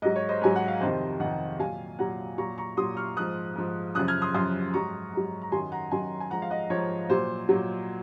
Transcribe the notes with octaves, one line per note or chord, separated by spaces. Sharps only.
G#2 F#3 D#5
C#5
C5 D#5
G#2 F#3 G#5
F#5
F5
F2 C3 D#3 C5 D#5
F2 C3 D#3 D#5 F#5
A#2 F#3 F5 G#5
A#2 F#3 F#5 A#5
A#2 F#3 A#5 C#6
A#5 C#6
A#2 F#3 C6 D#6
C#6 F6
G#2 F3 D#6 F#6
G#2 F3
F#2 C#3 F3 D#6 F#6
F6 G#6
C6 D#6
F#2 C#3 F3 C6 D#6
G#2 F#3 A#5 C#6
G#2 F#3
A#5
F#2 D#3 F#3 G#5 C6
F#5 A#5
F#2 D#3 F#3 G#5 C6
G#5
G#2 F3 F#5 A#5
F5
D#5 F#5
G#2 F3 C#5
A#2 F#3 C5
A#2 F#3